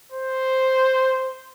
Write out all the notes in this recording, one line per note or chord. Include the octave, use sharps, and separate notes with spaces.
C5